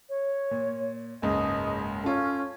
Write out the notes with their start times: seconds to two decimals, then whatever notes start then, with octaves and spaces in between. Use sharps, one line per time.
0.09 C#5
0.51 A#2
1.22 F#1 C#2 G#2 D#5
2.04 C#4 F4 A4